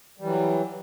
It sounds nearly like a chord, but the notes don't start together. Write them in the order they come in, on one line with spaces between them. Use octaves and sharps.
G3 E3 F#3